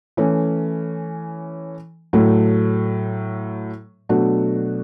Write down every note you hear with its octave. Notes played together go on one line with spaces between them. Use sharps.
E3 A3 C#4
A2 F#3 A3
B2 F#3 A3 D4 F#4